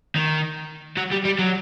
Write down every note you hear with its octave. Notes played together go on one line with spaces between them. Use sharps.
D#3
F#3
G3
G3
F#3